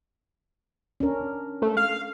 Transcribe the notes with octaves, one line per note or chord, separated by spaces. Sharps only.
C#4 D4 A#4
A3
F5